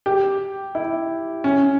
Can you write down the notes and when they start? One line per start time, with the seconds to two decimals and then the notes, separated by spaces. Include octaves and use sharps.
0.06 G4
0.75 E4
1.44 C#4